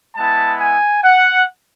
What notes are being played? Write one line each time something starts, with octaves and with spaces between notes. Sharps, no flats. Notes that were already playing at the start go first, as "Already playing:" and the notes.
G#3 B3 E4 A5
G#5
F#5